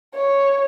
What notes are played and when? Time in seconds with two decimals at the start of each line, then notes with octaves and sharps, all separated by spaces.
0.15 C#5